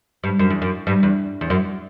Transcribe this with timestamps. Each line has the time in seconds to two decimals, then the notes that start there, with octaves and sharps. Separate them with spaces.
0.24 G2
0.39 F#2
0.50 E2
0.62 F#2
0.87 G2
1.03 E2
1.41 E2
1.50 F#2